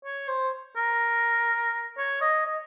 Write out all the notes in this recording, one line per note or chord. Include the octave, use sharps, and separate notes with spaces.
C#5
C5
A#4
C#5
D#5
D#5